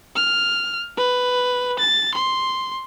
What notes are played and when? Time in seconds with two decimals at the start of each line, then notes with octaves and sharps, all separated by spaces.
0.16 F6
0.97 B4
1.79 A6
2.14 C6